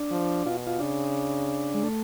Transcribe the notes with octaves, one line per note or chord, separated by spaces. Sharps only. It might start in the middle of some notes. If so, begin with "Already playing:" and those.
Already playing: D4
F3
B2 F4
F4
C#3 D4
G#3
A3